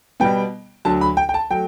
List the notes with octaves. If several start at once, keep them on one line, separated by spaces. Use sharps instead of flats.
B2 G3 B3 G5
D2 D3 F#3 A5
B5
G5
G5
A5
F#3 A3 G5